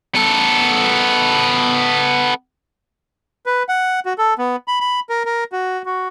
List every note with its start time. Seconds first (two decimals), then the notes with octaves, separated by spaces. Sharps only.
0.15 B3 A4
3.46 B4
3.69 F#5
4.05 F#4
4.18 A4
4.38 B3
4.68 B5
4.80 B5
5.09 A#4
5.25 A#4
5.52 F#4
5.86 F#4